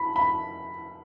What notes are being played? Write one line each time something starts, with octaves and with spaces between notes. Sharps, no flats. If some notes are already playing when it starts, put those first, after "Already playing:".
Already playing: B5
B5